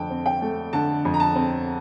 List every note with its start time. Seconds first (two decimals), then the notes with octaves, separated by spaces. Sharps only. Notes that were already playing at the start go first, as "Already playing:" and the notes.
Already playing: F2 D3 A3 G5 A5
0.10 C4
0.26 G5
0.42 A3
0.73 D3 A5
1.05 F2
1.14 A#5
1.20 A5
1.35 C4